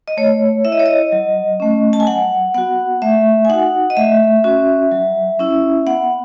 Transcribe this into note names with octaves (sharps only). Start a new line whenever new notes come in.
D#5
A3 C#5
E4 E5
D#5
C#5
D#5
F#3
A3 C#4
A5
G#5
F#3 F#5
B3 F#4 F#5
A3 E5
G#5
D#4 F#4 F#5
D#5
A3 E5
C#4 F#4
F#3
C#4 E4
B3 F#5